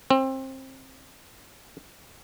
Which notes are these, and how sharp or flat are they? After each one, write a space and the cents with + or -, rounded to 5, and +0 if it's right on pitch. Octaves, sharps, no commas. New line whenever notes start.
C4 +25